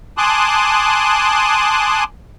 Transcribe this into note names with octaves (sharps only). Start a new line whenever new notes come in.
G#5 A5 C6 D6 D#6 F#6